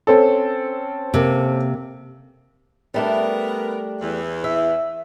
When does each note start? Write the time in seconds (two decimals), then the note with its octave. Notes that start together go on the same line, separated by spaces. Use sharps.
0.07 C4 C#4 A4
1.14 C3 A#3
2.94 G3 A3 B3 D4 A#4
4.01 E2 E3
4.44 E5